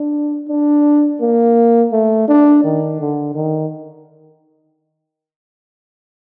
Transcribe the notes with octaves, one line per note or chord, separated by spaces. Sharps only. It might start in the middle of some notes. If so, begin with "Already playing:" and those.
Already playing: D4
D4
A#3
A3
D4
D#3
D3
D#3